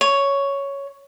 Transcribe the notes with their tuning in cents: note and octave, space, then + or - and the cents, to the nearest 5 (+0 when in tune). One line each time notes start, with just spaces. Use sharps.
C#5 +5